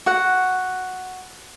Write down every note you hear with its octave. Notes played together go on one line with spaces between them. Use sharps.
F#4 F#5